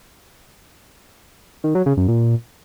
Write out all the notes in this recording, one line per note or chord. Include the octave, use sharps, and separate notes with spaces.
D#3
F#3
C#3
F#2
A#2